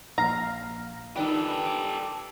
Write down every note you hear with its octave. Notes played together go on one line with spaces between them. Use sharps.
A#1 F5 A#5
D#3 D4 G4 A4 B4
D6